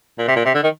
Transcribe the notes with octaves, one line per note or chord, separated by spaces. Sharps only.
A#2
C3
A#2
C3
D3
D#3